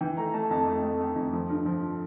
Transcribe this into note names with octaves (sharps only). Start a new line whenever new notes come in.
E3 G5
A3 A#5
A3 A5
F2 A5
A3
A3
A3
F2
F3
G2
F3